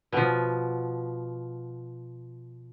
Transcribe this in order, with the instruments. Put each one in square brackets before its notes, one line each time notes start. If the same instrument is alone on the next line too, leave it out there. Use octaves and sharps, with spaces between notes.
[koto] B2 F3